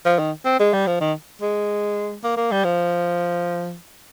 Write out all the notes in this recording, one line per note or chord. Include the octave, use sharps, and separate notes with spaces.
F3
D#3
C4
G#3
G3
F3
D#3
G#3
A#3
A#3
G3
F3